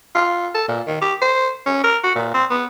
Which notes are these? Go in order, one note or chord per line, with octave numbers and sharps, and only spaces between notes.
F4
A4
A#2
D#3
G4
C5
C#4
A#4
F#4
A#2
C4
B3